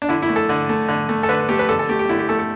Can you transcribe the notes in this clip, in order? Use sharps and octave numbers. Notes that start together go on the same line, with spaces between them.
D4
D3 E4
E4
A3
A4
D3
A3
D3
A3
A4
D3 B4
A3 G4
B4
D3 A4
A4
A3 G4
G4
D3 E4
G4
A3 A4
A4